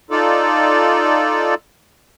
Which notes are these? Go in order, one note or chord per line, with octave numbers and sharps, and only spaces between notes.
D#4 F4 A4 D5